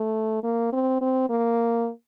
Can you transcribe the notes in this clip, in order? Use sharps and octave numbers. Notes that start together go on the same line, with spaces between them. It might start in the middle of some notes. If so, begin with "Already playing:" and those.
Already playing: A3
A#3
C4
C4
A#3